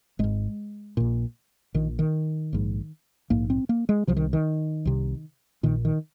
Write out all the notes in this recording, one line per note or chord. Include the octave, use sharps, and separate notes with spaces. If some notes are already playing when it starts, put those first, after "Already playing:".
G#1 G#2 G#3
A#1 A#2
A#1 A#2 D#3
D#3
A#1 G#2
A#1 G#2 A#3
C4
A#3
G#3
C2 C3 F3
D#3
D#3
C2 C3
A#1 A#2 D#3
D#3